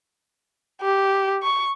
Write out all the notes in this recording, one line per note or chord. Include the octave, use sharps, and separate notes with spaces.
G4
C#6